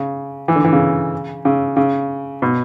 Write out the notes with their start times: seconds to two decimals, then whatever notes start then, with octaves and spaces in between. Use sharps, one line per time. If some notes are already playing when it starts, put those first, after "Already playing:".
Already playing: C#3
0.48 E3
0.56 D3
0.65 E3
0.73 C#3
1.45 C#3
1.77 C#3
2.42 B2